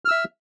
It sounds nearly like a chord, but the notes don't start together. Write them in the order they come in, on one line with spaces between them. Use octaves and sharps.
F6 E6 E5